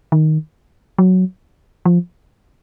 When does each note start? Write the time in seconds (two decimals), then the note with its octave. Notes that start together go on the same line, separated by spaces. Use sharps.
0.12 D#3
0.98 F#3
1.85 F3